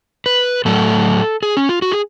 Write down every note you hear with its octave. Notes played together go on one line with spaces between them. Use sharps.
B4
A2 F#3 A3 A4
G#4
C#4
F4
F#4
G#4